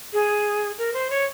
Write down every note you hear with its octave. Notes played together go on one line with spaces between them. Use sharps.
G#4
A#4
C5
C#5